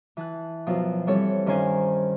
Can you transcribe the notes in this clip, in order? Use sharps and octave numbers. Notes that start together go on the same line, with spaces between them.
E3 A5 F#6
F#2 B2 F3
E3 G3 C4 A4 C#5
G2 D#3 C#4 C5 G#5